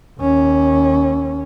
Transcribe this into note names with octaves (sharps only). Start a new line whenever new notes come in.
D#2 C#4